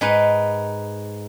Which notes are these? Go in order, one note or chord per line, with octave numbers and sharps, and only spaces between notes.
G#2 D#4 B4